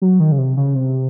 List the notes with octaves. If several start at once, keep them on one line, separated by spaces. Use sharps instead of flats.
F#3
D#3
C#3
C3
C#3
C3